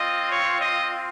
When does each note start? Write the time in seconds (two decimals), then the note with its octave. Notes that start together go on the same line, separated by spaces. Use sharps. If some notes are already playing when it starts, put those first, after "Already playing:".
Already playing: C4 F4 D#5
0.30 C#5
0.60 D#5